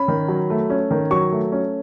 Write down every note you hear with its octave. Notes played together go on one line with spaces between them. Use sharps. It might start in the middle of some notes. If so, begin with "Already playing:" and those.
Already playing: C#4 B5
D#3
F#3
A3
C#4
D#3
F#3 C#6
A3
C#4